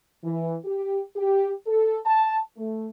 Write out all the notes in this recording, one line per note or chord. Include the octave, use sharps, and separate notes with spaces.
E3
G4
G4
A4
A5
A3